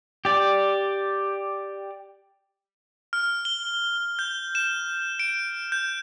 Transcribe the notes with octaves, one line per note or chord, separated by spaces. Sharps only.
G4 D5
F6
G7
G6
E7
D7
G6